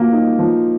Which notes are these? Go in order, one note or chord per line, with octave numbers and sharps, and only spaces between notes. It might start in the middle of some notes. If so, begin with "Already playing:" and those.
Already playing: F3 A#3 F#4
D#4
F3